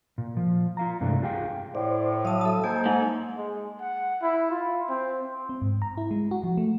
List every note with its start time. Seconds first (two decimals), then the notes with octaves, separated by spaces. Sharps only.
0.18 A#2
0.37 F3
0.77 F4 F5 A#5
1.01 G2 C3 E3 G#3 A3 D4
1.22 F4 G4 G#4 F5 G5
1.75 A2 C5 D5
2.25 F#3 E5 F5 A5 D#6
2.41 A4 A5
2.64 A#3 D#4 A4 C5 G#5
2.86 G#2
3.38 G#3
3.81 F#5
4.22 E4
4.51 F4
4.90 C4
5.49 C4
5.62 G#2
5.82 A#5
5.97 E4
6.11 G#3
6.31 F#4
6.44 F3
6.57 A3